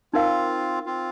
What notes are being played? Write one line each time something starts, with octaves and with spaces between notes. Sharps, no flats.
C4 D#4 F4 A#4 F5
C4 F4